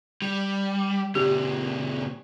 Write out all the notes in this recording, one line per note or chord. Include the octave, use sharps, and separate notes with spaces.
G3
A#2 C#3 G4